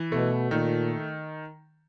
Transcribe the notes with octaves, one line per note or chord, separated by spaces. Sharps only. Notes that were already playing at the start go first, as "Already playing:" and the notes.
Already playing: E3
B2 A3
A#2 D#3